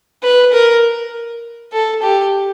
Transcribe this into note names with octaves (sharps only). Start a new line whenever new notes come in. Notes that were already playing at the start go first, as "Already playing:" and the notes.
B4
A#4
A4
G4